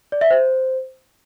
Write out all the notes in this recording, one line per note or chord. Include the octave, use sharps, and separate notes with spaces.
D5
E5
C5